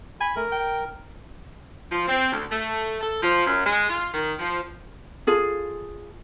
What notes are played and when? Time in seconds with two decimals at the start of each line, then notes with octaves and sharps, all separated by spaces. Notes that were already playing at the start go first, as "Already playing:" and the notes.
0.21 G#5 B5
0.36 A3 A#4
0.52 G5
1.91 F3
2.08 C4
2.32 D2
2.51 A3
3.01 A4
3.23 F3
3.46 F#2
3.65 G#3
3.89 F4
4.14 D#3
4.39 F3
5.27 F4 G#4 A4